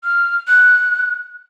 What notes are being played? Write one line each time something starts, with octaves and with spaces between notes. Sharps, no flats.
F6
F#6